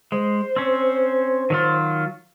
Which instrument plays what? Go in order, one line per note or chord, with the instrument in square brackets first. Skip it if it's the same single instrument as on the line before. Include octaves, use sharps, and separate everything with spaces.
[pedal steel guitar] G#3 [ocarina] C5
[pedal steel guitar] C4 C#4
D#3 F#3 F4